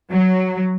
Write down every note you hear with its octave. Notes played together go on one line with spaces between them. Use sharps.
F#3